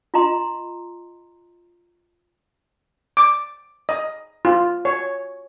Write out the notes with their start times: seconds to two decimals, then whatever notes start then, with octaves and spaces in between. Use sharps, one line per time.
0.14 F4 D#5 A#5 C6
3.17 D6
3.89 D#5
4.45 F4
4.85 C#5